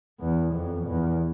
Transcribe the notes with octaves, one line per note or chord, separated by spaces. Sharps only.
E2
F2
E2